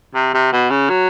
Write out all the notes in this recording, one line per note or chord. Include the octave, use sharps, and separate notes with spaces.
C3
C3
B2
C#3
F#3